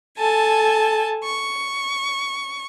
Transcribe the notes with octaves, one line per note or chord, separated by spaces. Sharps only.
A4 G#5 A5
C#6